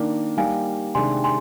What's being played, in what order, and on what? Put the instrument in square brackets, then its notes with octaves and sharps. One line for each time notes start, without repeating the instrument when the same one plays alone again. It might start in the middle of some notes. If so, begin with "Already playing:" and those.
Already playing: [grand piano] D#3 A#3 D4
[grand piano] G3 A#3 D#4 G4 [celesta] F5 G#5
[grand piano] C3 D#3 G#3 D4 G4 [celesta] G#5 C6
[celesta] G#5 C6